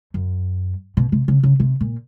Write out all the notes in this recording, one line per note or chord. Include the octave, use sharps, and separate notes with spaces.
F#2
B2
C3
C#3
C#3
C3
A#2